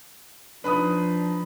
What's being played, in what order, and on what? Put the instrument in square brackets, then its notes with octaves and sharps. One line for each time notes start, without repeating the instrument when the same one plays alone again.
[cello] F3 [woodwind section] D4 D#4 [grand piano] B4 B5 D#6